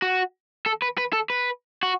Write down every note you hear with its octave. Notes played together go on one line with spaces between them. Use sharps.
F#4
A4
B4
B4
A4
B4
F#4